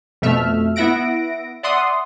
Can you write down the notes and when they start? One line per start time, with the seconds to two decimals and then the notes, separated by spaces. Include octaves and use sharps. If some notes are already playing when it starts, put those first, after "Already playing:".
0.22 F2 B2 A3 E5 F6
0.76 B3 E4 E5 F#5 A#6 D7
1.63 D5 E5 F#5 C6 D#6